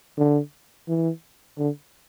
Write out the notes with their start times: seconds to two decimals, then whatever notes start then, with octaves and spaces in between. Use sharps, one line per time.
0.17 D3
0.88 E3
1.58 D3